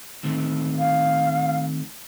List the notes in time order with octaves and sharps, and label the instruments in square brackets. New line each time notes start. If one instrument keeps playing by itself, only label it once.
[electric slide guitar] D#3 A3 C4
[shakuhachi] F5